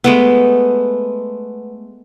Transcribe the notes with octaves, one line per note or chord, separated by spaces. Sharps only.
G#3 A3 B3